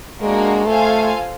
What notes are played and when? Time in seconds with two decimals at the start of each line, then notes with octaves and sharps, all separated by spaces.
0.22 G#3 A#3 D4 F#4 A#4
0.66 A3 F4 A4 C5 F5 G#5